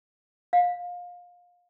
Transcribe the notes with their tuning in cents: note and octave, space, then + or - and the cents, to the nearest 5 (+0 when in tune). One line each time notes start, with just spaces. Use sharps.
F5 +25